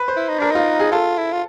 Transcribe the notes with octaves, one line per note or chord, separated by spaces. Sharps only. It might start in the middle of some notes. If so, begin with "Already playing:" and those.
Already playing: B4
C5
E4
D#4
D4 A#4
D#4 F4
G#4
F4 A4
E4
F4